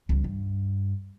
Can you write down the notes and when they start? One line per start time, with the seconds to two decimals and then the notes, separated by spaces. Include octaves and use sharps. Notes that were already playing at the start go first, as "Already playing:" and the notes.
0.09 C#2 G3
0.24 G2